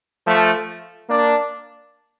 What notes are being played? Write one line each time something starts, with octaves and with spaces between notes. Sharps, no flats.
F3 A3
A#3 D4